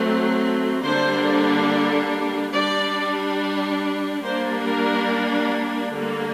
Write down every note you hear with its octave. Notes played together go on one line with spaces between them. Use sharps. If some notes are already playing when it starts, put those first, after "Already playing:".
Already playing: F#3 A3 C4
D3 G3 A#3 D4 C5
G3 D4 D5
G3 A#3 D4 C5
A#4
D3 G3 A#3